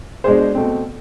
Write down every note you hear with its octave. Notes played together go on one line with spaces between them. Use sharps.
B2 G#3 D4 G#4 C5
B2 A3 C4